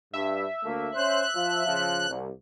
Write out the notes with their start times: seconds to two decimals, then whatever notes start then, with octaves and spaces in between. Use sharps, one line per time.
0.13 G2 E5
0.63 D2 A3 A#3
0.94 C#4 C5 F#6
1.35 F3
1.65 C#3 F3
2.09 C2